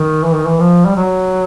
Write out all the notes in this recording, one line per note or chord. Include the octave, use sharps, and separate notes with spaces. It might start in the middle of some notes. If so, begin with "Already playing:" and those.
Already playing: D#3
E3
D#3
E3
F3
G3
F#3